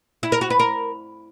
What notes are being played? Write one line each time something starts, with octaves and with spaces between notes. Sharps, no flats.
E4
A#4
F#4
B4
A#4